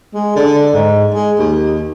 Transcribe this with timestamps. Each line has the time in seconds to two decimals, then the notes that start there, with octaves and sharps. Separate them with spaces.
0.14 G#3
0.36 D3
0.73 G#2
1.14 G#3
1.38 D#2